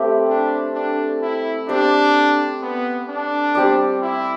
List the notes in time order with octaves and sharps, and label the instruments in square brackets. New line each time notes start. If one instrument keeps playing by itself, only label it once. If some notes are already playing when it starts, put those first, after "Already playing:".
Already playing: [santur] A3 C4 G4 B4
[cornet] D4
D4
E4
[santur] C4 G4 C5 [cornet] D4
[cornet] B3
D4
[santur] G3 C4 G4 D5
[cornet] E4